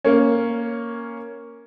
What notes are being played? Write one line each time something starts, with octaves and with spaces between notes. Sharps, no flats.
A#3 C#4